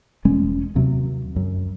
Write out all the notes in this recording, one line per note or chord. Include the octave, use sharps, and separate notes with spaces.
E1 G3 G#3 C#4
D#2 C3 F#3
C#2 F#2